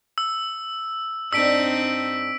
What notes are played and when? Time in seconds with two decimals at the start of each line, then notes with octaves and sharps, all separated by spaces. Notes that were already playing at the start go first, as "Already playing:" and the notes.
0.18 E6
1.33 G2 C4 D4 D#4 E6 B6 D7